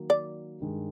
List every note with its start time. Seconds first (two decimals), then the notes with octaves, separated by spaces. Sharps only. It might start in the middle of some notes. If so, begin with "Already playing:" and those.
Already playing: D#3 F#3 A#3
0.10 D5
0.60 G2 D#3 G#3